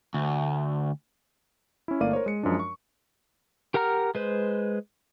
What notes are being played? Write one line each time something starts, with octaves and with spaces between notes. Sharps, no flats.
D2
C#4 E4
G1 A3 A#3 D5 F5 D#7
A#4 C5 C#5
G#3 C#7
F#2 F3 G#3 D4
C#6
G4 A#4 F#5 A#5 F6
G#3 B4 C5